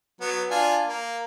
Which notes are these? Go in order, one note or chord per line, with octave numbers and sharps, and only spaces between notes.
F#3 B3
D4 F4 G#5
A#3